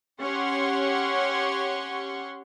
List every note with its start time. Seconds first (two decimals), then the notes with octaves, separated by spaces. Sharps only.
0.22 C#4 G4 C#5 F#5 C6 C#6